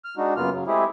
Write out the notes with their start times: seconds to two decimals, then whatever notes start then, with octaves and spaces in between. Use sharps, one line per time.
0.05 F6
0.17 G#3 D4 D#4 F#4
0.36 F#2 C#3 A#3 B3 F4 F6
0.51 C#3 F#3
0.67 G#3 A3 C4 E4 G4 G#4